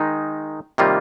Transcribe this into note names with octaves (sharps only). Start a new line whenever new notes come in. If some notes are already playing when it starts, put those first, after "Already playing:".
Already playing: D#3 G#3 D#4
C3 D#3 G3 A#3 F4